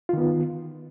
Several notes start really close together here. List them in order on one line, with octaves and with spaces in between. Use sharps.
F4 D#3 B3